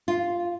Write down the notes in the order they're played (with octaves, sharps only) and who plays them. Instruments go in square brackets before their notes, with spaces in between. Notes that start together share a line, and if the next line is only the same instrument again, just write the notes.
[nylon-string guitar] F4